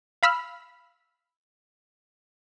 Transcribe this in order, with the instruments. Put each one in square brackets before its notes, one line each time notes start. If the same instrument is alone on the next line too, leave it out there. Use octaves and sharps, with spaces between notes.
[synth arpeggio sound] F5 B5 E6 F6